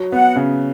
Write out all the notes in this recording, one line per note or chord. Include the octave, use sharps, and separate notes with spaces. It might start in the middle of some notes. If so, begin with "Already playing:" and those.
Already playing: F#3
B3 F#5
C#3